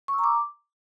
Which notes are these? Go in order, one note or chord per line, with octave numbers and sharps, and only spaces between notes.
C#6
E6
A#5
D6